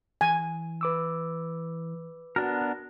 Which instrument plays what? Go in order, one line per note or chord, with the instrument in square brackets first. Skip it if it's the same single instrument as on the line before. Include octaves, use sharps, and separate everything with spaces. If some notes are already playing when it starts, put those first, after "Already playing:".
[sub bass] E3 [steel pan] G#5
[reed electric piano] B4 D6 E6
[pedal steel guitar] B3 D4 A#4 [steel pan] F#4